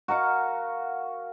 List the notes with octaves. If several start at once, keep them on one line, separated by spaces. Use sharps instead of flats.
F#4 A#4 F5 F#5